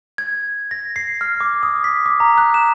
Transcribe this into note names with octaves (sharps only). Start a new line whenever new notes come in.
G#6
A#6
C7
F6
D6
D#6
B6
D6
A#5
F#6
E7